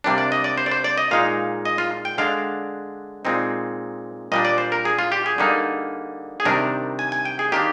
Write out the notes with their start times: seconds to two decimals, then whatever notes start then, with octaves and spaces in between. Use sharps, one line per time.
0.04 C3 G3 A#3 D4
0.18 D5
0.32 D#5
0.44 D5
0.58 C5
0.66 D5
0.71 C5
0.84 D5
0.98 D#5
1.11 A#2 G#3 D#4 F5
1.65 D#5
1.78 F4
2.05 G5
2.18 D3 G#3 D4 F5
3.25 A#2 G#3 C4 D#4
4.32 A#2 G3 D4 D#5
4.45 D5
4.58 C5
4.72 A#4
4.85 G#4
4.99 F4
5.12 G4
5.26 G#4
5.38 D3 G3 A#3 D#4
6.40 G#4
6.45 C3 D#3 G3 D4 A#4
6.99 G#5
7.12 G#5
7.25 G5
7.39 G#4
7.52 D#3 A#3 D4 G4